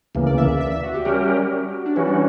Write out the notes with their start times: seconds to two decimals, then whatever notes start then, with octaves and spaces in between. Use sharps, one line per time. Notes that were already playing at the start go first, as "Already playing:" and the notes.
0.15 D2 C#3 E3 A#3
0.27 D5
0.38 E5
0.48 E5
0.61 E5
0.72 E5
0.83 F#4
0.94 G4
1.05 G3 C#4 F#4 G4 A#4
1.86 D4
1.96 E3 G3 C#4 E4 F#4
2.07 D4